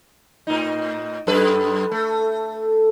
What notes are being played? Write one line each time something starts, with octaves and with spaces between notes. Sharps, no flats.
A2 D#4
F#2 A4 B4
A3